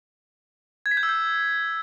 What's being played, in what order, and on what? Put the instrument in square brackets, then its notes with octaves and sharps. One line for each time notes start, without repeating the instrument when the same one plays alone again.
[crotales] G#6
B6
G6
E6
G6